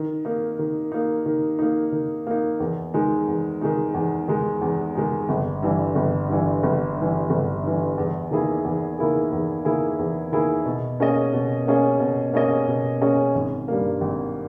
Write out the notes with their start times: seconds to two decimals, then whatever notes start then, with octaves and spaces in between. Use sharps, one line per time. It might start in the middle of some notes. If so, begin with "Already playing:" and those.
Already playing: D#3
0.25 A#3 D#4
0.59 D#3
0.92 A#3 D#4
1.26 D#3
1.59 A#3 D#4
1.92 D#3
2.27 A#3 D#4
2.60 E2
2.94 D#3 G#3 D#4
3.28 E2
3.61 D#3 G#3 D#4
3.94 E2
4.28 D#3 G#3 D#4
4.62 E2
4.95 D#3 G#3 D#4
5.29 G1
5.62 G2 E3
5.95 G1
6.29 G2 E3
6.63 G1
6.96 G2
7.02 E3
7.30 G1
7.64 G2 E3
7.98 E2
8.31 D#3 A#3 E4 G#4
8.65 E2
8.98 D#3 A#3 E4 G#4
9.32 E2
9.65 D#3 A#3 E4 G#4
9.99 E2
10.32 D#3 A#3 E4 G#4
10.65 B2
11.00 A#3 C#4 G#4 D#5
11.33 B2
11.67 A#3 C#4 G#4 D#5
12.00 B2
12.33 A#3 C#4 G#4 D#5
12.67 B2
13.01 A#3 C#4 G#4 D#5
13.35 G#1
13.68 G2 G3 A#3
14.01 G#1